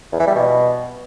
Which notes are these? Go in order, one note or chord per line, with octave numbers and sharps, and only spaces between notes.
E2
E3
G3
B2